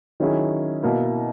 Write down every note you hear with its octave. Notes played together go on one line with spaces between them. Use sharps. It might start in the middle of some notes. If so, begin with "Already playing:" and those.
D#3 F#3 C#4 E4 G#4
B2 A#3 E4